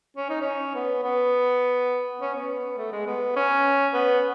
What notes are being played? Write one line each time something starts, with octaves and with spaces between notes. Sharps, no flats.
C#4
D#4
C#4
B3
B3
C#4
B3
A3
G#3
B3
C#4
B3